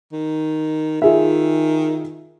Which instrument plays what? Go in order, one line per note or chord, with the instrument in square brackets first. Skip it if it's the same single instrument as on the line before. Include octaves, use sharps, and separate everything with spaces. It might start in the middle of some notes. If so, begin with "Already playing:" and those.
[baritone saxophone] D#3
[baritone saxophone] D#3 [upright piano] F4 G#4 E5